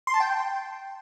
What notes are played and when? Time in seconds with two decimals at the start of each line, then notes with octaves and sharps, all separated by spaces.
0.07 C6
0.14 A5
0.20 G5